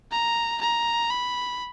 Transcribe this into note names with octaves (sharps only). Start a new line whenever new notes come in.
A#5
A#5
B5